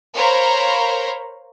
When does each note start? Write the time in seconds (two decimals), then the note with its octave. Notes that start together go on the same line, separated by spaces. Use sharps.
0.15 A#4 C5 C#5 F5 A#5 B5